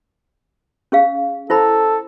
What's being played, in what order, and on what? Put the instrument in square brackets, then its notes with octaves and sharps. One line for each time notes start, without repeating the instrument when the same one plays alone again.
[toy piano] C#4 G#4 F5
[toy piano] E4 C5 B5 [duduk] A4